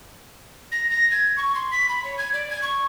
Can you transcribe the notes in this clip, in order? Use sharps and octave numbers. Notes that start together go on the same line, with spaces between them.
A#6
A#6
G#6
C#6
C6
B6
B5
C#5
G#6
D5
G#6
C#6